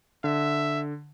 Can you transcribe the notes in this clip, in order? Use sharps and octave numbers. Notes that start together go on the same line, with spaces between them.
D3 E5